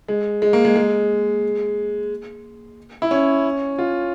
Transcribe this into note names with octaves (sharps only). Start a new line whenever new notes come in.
G#3
G#3
A#3
G#3
G#3
E4
C#4
F4